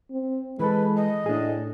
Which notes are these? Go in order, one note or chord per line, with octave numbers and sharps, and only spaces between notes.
C4
E3 G#3 A4 B4
D#5
A2 D4 G#4